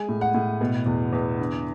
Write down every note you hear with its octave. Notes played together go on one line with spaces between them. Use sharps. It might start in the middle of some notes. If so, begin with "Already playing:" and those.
Already playing: G#3 G#5
A2
F#5
A2
B2
E2
E2
D3